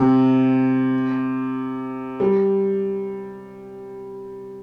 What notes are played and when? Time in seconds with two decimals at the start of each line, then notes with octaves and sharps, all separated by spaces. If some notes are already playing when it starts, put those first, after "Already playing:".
Already playing: C3
2.20 G3